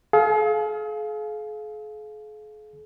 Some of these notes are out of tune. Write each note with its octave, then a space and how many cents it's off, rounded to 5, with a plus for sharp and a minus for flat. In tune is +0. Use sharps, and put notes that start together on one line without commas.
G#4 +45 F5 +0